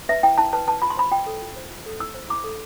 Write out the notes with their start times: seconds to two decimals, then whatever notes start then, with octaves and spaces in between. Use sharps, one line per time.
0.09 B4 E5
0.23 E4 G5
0.38 E4 A5
0.53 B4 A5
0.67 B4 A5
0.82 F4 B5
0.90 C6
0.97 C5 B5
1.11 F4 G5
1.26 A4
1.42 F4
1.56 C5
1.70 F4
1.86 A4
2.00 E4 E6
2.14 C5
2.30 E4 D6
2.44 A4